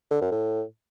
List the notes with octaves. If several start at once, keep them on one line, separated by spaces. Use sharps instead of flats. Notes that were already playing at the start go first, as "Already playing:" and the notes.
D3
F#2
A2